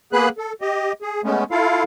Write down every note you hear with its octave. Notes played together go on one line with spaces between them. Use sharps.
A#3 B3 G#4 B4 B5 F#6
A4
G4 D#5
G#4
G#3 A3 B3 C#4
E4 F4 A4 F5